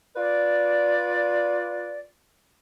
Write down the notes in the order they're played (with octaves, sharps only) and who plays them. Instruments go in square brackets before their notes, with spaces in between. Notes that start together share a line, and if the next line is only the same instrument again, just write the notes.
[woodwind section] F4 B4 D5